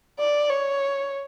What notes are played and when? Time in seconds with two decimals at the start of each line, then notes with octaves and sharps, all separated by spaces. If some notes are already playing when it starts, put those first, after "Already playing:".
0.19 D5
0.50 C#5